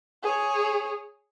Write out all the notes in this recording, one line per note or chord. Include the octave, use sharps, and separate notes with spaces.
G#4 C#5